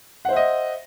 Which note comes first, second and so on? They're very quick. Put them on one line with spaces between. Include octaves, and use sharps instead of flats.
F#5 C5 E5 D#5